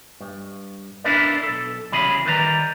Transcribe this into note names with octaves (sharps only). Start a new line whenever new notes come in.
G2
D4 E4 A#4 B4 D5
B1 A4
C2 C#3 E3 F#3 G#4 B5
D#3 G3 B4 D5 A#5